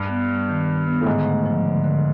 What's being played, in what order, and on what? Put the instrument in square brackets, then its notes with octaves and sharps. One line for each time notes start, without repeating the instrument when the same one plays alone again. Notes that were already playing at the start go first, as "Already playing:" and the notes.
Already playing: [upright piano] G2
[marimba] B3
G3
D#3
D#3
B3
[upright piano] A2
[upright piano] G#2 [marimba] D3
[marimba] A3
F3
D3
D3